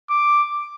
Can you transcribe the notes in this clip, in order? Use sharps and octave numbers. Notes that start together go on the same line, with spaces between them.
D6